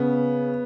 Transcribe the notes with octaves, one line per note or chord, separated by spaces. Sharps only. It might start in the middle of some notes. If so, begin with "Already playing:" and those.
Already playing: C#3 B3